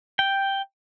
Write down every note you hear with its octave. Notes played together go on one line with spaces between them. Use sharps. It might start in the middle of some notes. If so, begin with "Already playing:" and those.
G5